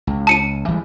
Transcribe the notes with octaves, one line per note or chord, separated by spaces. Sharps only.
C#2
A5 C#7 D#7
E3 G3 G#3